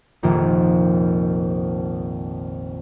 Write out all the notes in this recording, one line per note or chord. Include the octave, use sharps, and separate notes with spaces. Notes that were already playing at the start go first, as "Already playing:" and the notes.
F1 A#1 F2 D#3